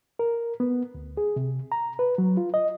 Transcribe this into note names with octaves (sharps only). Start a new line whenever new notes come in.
A#4
B3
D2
G#4
C3
A#5
B4
F#3
F4
D#5